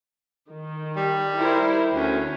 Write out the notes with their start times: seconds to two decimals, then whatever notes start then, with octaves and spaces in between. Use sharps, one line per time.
0.49 D#3
0.96 G3
1.36 E4 A#4 C5
1.93 D2 C#4